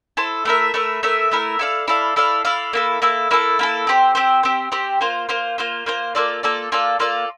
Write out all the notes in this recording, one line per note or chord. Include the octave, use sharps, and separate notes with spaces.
E4 A4 C5
A3 E4 A#4 E5
A3 E4 A#4 E5
A3 E4 A#4 E5
A3 E4 A#4 E5
E4 A4 D5 F5
E4 A4 D5 F5
E4 A4 D5 F5
E4 A4 D5 F5
A#3 E4 A4
A#3 E4 A4
A#3 E4 A4
A#3 E4 A4
C4 G4 C5
C4 G4 C5
C4 G4 C5
C4 G4 C5
A#3 F4 C5
A#3 F4 C5
A#3 F4 C5
A#3 F4 C5
A#3 F4 A4 D5
A#3 F4 A4 D5
A#3 F4 A4 D5
A#3 F4 A4 D5